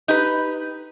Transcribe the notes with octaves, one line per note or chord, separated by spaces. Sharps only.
D#4 G4 B4